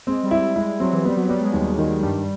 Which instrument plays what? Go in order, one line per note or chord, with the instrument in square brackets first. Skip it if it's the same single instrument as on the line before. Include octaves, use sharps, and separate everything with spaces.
[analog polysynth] G#3 [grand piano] C4
[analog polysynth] G3
[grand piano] E4
[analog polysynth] G#3 [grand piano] E4
[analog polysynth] F#3 [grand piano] C4
[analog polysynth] E3
[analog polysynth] G3 [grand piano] B3
[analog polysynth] F#3
[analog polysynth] G3 [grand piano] B3
[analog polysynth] G#3
[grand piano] D#2
D#3
[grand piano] G2 [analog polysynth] G3